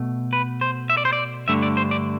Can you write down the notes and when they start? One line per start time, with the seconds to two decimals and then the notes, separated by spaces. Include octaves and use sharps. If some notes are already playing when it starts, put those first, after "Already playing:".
Already playing: B2 A3
0.33 B4
0.61 C5
0.90 E5
0.97 D5
1.05 C5
1.13 D5
1.48 G2 D3 A3 E5
1.63 D5
1.77 C5
1.91 D5